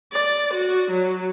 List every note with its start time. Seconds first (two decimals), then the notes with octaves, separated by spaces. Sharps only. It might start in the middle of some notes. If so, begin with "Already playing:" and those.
0.13 D5
0.54 F#4
0.91 F#3